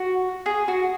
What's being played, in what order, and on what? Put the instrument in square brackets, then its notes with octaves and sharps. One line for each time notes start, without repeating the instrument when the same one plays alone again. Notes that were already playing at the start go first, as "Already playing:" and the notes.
Already playing: [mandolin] F#4
G#4
F#4